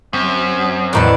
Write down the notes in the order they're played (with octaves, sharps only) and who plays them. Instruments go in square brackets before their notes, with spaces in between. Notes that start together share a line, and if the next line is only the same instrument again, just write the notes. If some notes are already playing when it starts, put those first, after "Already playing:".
[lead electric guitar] F#2 [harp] C4
[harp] E2 A2 B4 [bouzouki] D3 D#3 D4